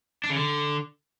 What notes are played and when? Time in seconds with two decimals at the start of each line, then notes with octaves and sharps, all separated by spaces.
0.24 D4
0.30 C#3
0.36 D3